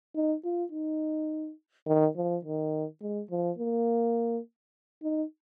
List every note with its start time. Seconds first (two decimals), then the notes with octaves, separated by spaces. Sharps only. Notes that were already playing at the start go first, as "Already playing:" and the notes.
0.15 D#4
0.44 F4
0.72 D#4
1.87 D#3
2.16 F3
2.45 D#3
3.01 G#3
3.31 F3
3.58 A#3
5.03 D#4